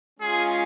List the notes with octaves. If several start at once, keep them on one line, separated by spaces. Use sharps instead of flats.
G#3 C#4 F4 G#4